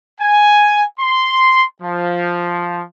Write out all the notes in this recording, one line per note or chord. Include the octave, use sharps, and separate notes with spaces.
G#5
C6
F3